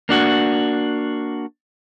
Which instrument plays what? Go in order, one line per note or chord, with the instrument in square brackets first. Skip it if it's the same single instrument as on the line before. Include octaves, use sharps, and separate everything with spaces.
[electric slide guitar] A#3 D4 F#4